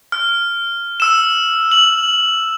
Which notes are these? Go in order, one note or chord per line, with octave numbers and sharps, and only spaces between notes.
F6
E6 E7
F#7